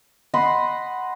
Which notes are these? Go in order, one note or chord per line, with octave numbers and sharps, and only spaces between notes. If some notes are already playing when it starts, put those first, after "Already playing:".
D#5 F#5 B5 C6